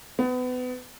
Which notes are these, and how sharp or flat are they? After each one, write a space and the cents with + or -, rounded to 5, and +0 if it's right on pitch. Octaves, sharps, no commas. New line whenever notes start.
B3 +30